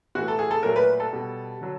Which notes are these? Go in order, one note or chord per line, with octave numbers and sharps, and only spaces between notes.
A2 E3 A3 F#4
A4
G#4
A4
A#2 F#3 A3 A#4
B4
A4
B2 G3
D3 F#3